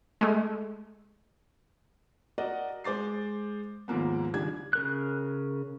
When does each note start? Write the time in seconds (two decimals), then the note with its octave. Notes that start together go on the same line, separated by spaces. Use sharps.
0.21 G#3 A3
2.38 F#4 A#4 D5 D#5 F#5
2.84 G#3 C5 D6 A6 C7
3.88 D#2 G#2 F3 A#3 B3
4.33 C#2 D#3 G3 D4 G#6
4.73 C#3 A#4 F#6